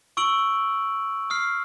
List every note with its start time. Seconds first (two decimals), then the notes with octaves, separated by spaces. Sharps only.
0.17 C#6 E6 D7 F#7
1.30 D#6 F6 C7